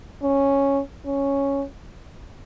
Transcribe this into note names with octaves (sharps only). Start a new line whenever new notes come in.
C#4
C#4